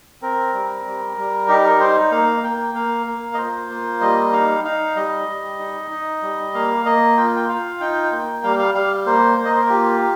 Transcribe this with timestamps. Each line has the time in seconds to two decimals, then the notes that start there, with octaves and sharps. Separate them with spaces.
0.22 C4 A#4
0.54 G3
0.85 G3
1.17 G3
1.48 D#4 G4
1.64 A#4
1.80 D#4 C5
2.12 A#3 F5
2.44 A#3 G5
2.74 A#3 F5
3.06 A#3
3.34 D#5
3.38 F4 C5
3.70 A#3
4.01 G3 D#5
4.33 D#4 F5
4.64 D#4 F5
4.96 G3 D#5
5.28 G3
5.59 D#4
5.91 D#4
6.22 G3
6.54 A#3 F5
6.85 A#3 D#5
7.17 F4 G5
7.36 G5
7.48 F4 F5
7.80 D#4 G5
8.12 A#3
8.43 G3 F5
8.59 F5
8.74 G3 F5
9.06 A#3 C5
9.38 A#3
9.45 D#5
9.53 C5
9.61 A#4
9.69 F4 G4